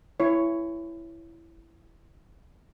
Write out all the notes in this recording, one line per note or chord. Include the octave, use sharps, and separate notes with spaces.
E4 C#5